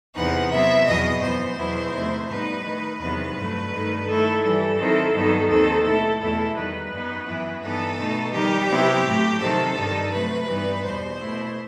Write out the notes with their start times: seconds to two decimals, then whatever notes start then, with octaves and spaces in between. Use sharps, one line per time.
0.16 E2 C3 E3 B3 D#4 F#5
0.51 C3 F#3 B3 E4 E5
0.87 E2 B2 F#3 B3 D#5
1.22 F#2 E3 B3 C5
1.57 E2 B2 F#3 B3 E4
1.93 E2 C3 D#3 A3 E4
2.28 A2 G3 B3 D#4 B4
2.64 D#3 A3 D#4
3.00 E2 C3 D#3 F#3 B3 B4
3.36 G2 F#3 A3
3.72 G2 D#3 A3
4.06 D#3 A3 E4 A4
4.42 G2 E3 G3 A4
4.78 D#3 F#3 C4 E4
5.13 G2 D#3 F#3 B3 D#4
5.49 D#2 D#3 F#3 C4 D#4 A4
5.84 B2 A3 E4 A4
6.20 E2 B2 A3 E4 A4
6.56 E2 D#3 G3 B4
6.92 F#2 F#3 B3 D#4
7.27 F#2 E3 B3 E4
7.63 G2 E3 B3 D#4 A4
7.98 B2 A3 D#4
8.33 D#3 G3 D#4 G4
8.70 C3 F#3 B3 E4
9.05 A2 F#3 A3
9.40 C3 D#3 F#3 C4 A4
9.76 G2 D#3 G3 D#4
10.12 C3 F#3 A3 B4
10.48 G2 E3 G3 B3 D#4
10.82 E2 B2 G3 C5
11.19 B2 A3 E4